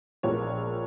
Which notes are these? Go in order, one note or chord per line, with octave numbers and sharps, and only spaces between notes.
A#1 A#2 F3 G#3 C#5